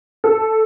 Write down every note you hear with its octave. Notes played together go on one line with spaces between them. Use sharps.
A4